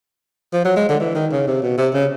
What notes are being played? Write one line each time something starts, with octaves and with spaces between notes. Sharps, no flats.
F3
F#3
G#3
D3
E3
D#3
C#3
C3
B2
C3
C#3